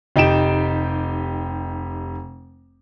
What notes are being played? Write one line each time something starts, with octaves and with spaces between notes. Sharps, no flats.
F1 D#4 G4 D7 E7